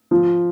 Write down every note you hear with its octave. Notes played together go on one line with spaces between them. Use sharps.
F3